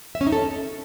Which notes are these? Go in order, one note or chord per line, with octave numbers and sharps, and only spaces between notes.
E5
C#4
D#4
A4